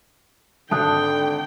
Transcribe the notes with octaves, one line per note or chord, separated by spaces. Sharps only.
G#1 D3 G5 A5 D#6 F#6